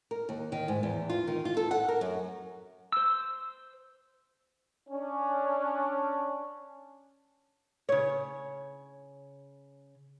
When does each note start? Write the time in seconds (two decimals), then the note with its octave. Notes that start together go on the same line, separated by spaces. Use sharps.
0.11 A#4
0.29 D#2
0.52 D#3
0.68 G#2
0.83 E2
1.09 F4
1.27 D#3
1.45 F4
1.57 A4
1.71 F#5
1.88 A#4
2.01 F#2
2.92 C5 E6
4.89 C#4 D4
7.89 C#3 C#5